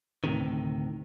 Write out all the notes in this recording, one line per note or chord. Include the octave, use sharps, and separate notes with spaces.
D2 A2 C3 D#3